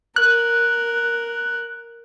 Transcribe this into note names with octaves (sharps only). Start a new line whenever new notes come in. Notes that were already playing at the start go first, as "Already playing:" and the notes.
A#4 F#6